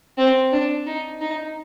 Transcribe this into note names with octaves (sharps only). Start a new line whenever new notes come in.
C4
D4
D#4
D#4